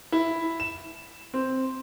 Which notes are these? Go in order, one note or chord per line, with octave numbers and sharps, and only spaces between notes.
E4
E7
C4